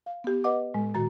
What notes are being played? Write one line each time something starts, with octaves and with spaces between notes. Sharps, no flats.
F5
B3 G4
B4 D#5 F#5 D6
A2 G#3
A#2 D#3 F#4 A#5 A6